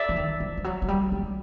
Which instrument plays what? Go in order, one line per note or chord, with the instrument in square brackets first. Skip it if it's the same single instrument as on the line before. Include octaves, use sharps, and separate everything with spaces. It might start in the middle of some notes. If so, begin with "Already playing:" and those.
Already playing: [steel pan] D5 E5
[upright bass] E3
D#3
F3
F3
F#3
F#3
G3
G#3